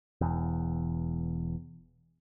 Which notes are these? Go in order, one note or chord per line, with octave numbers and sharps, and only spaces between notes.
E1 E2